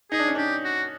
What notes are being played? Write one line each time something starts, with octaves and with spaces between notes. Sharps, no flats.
D#4 G#4
D4
C#4
D4 G4
F#4